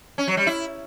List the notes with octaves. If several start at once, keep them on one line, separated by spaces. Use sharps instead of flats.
C#4
F#3
G3
E4